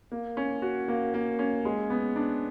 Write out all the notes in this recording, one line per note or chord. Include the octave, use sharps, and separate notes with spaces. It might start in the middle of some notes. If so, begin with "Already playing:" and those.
A#3
C#4
F#4
A#3
A#3
C#4
G#3
B3
D4